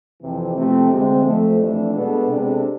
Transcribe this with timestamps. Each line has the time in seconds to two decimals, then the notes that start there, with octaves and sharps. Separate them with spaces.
0.20 F2 C3 E3
0.55 C3 F3 A3 C4
0.89 D2 D3 G#3 C4
1.24 F2 C3 F3 A3
1.58 F2 E3 A3 D4
1.93 B2 G#3 B3 D4 A4
2.27 C3 G#3 D4 A4